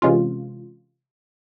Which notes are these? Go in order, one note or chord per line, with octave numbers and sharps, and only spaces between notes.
C3 E3 G#3 C#4 F4